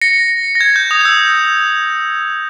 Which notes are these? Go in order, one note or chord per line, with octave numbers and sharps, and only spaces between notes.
A#6 C#7
A#6
G#6
G6
D#6
G6
E6